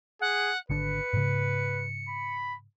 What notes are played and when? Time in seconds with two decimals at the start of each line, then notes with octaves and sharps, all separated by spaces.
0.21 G#4 F#5
0.70 G#1 D3 D4 B4 C#7
1.13 G#2 C#3
2.09 B5